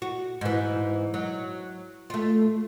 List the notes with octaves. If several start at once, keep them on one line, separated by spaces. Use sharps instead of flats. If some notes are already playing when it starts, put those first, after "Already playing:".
F#4
G#2 E3
F#3
A3 F4